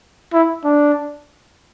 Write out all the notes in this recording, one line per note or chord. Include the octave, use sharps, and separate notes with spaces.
E4
D4